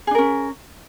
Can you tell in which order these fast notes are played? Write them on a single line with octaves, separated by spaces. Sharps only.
G#4 D4 A#4 C#4